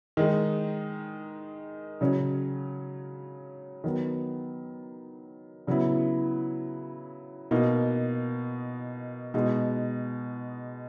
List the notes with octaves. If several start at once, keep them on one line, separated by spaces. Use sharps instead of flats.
D#3 G#3 D#4
C#3 F#3 C#4
D#3 F#3 B3
C#3 F#3 B3 E4
B2 A#3 D#4
B2 G#3 D#4